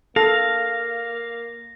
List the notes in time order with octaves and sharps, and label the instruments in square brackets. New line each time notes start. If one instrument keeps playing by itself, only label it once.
[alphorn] A#3 [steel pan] A4 [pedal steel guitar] F5 [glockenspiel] A#6